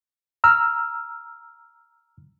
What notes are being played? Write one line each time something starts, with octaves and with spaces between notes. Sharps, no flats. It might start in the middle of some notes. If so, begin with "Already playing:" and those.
A#5 E6 F6